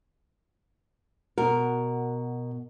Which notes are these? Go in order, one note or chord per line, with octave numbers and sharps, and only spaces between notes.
B2 F#4 A#4